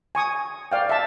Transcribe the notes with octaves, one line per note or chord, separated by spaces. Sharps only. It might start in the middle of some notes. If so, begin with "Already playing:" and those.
G#5 C#6 D#6
D5 F5 G5
E5 A5